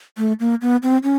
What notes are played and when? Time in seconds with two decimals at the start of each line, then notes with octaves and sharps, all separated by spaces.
0.18 A3
0.40 A#3
0.62 B3
0.83 C4
1.04 C#4